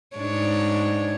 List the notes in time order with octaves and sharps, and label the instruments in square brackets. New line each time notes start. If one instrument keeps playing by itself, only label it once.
[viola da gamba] G#2 D4 C#5